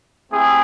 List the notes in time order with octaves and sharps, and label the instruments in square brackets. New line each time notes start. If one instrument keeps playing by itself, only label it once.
[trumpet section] A3 C4 E4 G4 G#4